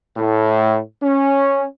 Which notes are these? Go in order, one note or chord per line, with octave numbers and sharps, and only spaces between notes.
A2
C#4